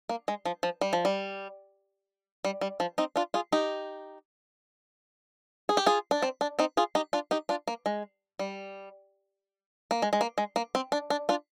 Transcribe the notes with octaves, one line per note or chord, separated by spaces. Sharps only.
A#3
G#3
F3
F3
G3
F3
G3
G3
G3
F3
C4 D#4
D4 F4
F4 G#4
D#4 G4
G#4
G4
F4 G#4
D4
C4
D4
C4 D#4
F4 G#4
D#4 G4
D4 F4
D#4 G4
D4 F4
A#3
G#3
G3
A#3
G#3
G#3
A#3
G#3
A#3
C4
D4
D4
D4 F4